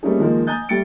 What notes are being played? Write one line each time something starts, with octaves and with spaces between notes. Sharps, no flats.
G3 A3 A#3 C#4 D#4 G#4
D#3 F3 G#3 A#3
G#5 A#5 D#6 G6 A6
G3 A3 G5 A6 C#7 D7